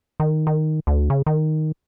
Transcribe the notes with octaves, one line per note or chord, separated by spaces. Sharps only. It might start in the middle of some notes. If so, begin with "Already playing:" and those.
D#3
D#3
D2
C#3
D#3